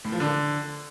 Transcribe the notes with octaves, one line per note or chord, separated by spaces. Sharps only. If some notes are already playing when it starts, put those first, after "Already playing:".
A2
F3
D3